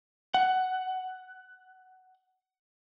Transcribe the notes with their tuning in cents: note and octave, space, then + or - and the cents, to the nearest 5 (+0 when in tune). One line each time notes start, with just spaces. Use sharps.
F#5 +10